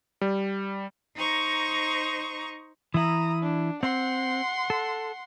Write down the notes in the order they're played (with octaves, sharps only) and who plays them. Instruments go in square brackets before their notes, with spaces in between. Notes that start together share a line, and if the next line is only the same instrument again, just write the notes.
[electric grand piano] G3
[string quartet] D#4 C5 A#5 C#6
[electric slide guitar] E3 E4 [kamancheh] A#5 D#6
[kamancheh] D4
[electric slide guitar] C4 [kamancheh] F#5 C6
[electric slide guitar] A4